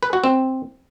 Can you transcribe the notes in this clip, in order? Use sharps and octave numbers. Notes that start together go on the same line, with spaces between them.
B4
F#4
C4